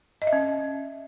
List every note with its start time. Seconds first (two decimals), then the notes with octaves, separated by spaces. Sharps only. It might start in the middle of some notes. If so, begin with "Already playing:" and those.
0.22 D#5
0.27 E5
0.33 C#4